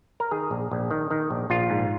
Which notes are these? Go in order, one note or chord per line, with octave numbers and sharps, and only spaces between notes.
A#4
D#3 G#4
A#1
A#1
D#3
D#3
A#1
A#1 F4
G#2